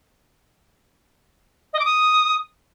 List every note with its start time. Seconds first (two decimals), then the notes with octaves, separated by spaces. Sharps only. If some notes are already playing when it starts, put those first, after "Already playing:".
1.73 D#5
1.79 D6
1.85 D#6